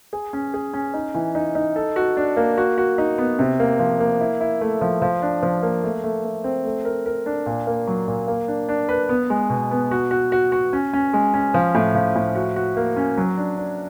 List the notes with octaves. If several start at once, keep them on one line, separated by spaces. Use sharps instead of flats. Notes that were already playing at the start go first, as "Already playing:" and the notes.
G#4
C#4
G#4
C#4
D#4
E3
D#4
D#4
A4
F#4
D4
A#3
F#4
F#4
D#4
B3
C3
A#3
F3
A#3
E4
E4
A3
F3
F3
D4
F3
A#3
A3
A3
A3
C4
A3
A#4
A#4
D4
A#2
A#3
F#3
A#2
A#3
D4
D4
B4
B3
G#3
B2
B3
F#4
F#4
F#4
F#4
C#4
C#4
G#3
C#4
F3
A2
F3
A2
F#4
F#4
A#3
C#4
F#3
D4
D4